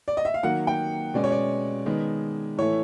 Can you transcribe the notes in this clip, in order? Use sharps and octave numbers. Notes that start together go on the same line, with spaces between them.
D5
D#5
E5
F5
D#3 F#3 A#3 F#5
G5
B2 G#3 C#4 D5
C#5
D5
D#3 G#3 B3
A2 E3 A3 C#5